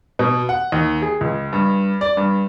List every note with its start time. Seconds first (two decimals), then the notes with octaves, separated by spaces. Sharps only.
0.19 B2
0.49 F#5
0.72 D#2
1.02 G#4
1.21 C#2
1.53 G2
2.01 D5
2.17 G2